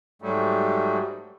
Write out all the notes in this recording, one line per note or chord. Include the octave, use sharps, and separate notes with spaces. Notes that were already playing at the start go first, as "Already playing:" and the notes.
G#2 F#3 G3 A3